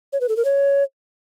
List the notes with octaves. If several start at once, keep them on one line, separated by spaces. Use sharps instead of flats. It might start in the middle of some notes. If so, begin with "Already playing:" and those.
C#5
B4
A4
A#4
C#5